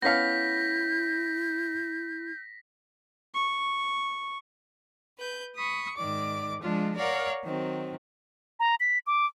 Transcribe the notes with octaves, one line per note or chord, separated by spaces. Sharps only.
B3 C#4 E4 F5 G6 A#6 B6
C#6
B4 G6
B5 C#6 D#6
G#2 D#3 D5 D6
F3 G#3 D4 F4
A#4 C#5 D5 F5 F#5 A#5
D#3 F#3 C4
A#5
B6
D6